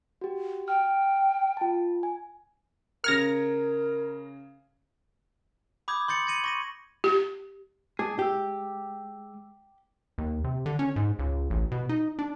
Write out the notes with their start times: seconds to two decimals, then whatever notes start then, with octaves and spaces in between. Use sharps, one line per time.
0.21 F#4 G4
0.68 G5 F6
1.57 F4 A5
2.03 G#5
3.04 C#3 A#4 F6 G#6 A#6 C#7
5.88 B5 D6 D#6 G6 G#6
6.08 C6 G6 A6 C#7 F#7
6.27 G#6 A#6 C#7 D#7 F#7
6.44 C#6 A#6 D#7
7.04 G4
7.99 G#3 G#4 A5 D6
8.19 G#3 G4 E6
10.18 D#2
10.44 C3
10.66 D3
10.79 C#4
10.96 G#2
11.19 C#2
11.50 A1
11.71 B2
11.89 D#4
12.19 D4